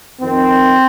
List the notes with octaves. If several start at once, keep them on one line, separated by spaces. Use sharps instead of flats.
F2 D#3 C4